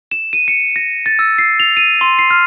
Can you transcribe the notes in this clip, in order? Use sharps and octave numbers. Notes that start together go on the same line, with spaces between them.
E7
D#7
C#7
A#6
A6
E6
C7
F7
D#7
C6
C7
F6